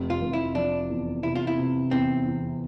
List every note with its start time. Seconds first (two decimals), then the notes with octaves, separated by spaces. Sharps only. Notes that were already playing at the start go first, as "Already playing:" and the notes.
Already playing: F1
0.10 F4
0.22 F1
0.33 E4
0.55 F3 D4
0.89 E2
1.23 C3 E4
1.35 F4
1.47 E4
1.58 C3
1.91 E2 C4
2.25 E2